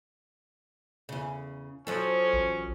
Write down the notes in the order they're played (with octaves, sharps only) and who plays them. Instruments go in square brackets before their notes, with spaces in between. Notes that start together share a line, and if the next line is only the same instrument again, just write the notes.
[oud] E2 C#3
[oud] F3 F#3 A4 [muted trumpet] C#4
[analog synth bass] A1